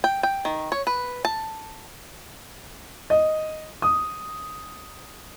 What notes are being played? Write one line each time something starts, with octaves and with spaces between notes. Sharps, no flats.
G5
G5
D#3
C#5
B4
A5
D#5
D#6